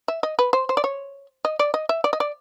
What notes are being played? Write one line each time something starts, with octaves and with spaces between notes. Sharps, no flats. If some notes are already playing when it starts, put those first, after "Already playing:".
E5
D#5
B4
C5
C5
D5
C#5
D#5
D5
D#5
E5
D5
D#5
D5